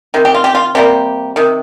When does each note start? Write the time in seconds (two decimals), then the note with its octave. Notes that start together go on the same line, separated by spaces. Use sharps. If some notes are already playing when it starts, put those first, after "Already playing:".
0.14 C3 D#3
0.25 G4
0.35 F4
0.44 G4
0.55 F4
0.75 C3 G3 A#3 G4
1.36 C3 D#3